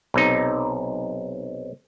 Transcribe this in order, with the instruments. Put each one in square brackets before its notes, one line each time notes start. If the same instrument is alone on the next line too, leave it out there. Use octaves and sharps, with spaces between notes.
[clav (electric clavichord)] B1 C3 D#4